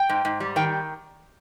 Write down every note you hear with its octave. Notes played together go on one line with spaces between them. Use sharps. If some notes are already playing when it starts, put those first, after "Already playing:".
Already playing: G5
G#2
G#2
G3
D#3 G5